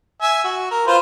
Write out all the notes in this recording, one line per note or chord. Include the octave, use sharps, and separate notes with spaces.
E5 G#5
F#4
A#4
F4 B4 C5